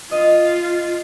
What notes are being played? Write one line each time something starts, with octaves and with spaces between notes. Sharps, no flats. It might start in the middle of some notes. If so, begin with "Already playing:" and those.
F4 D#5